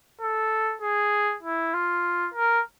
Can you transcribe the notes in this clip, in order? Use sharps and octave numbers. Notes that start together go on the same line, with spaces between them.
A4
G#4
E4
F4
A#4